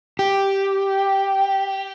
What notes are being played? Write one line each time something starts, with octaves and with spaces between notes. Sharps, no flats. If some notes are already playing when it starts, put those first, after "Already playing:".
G4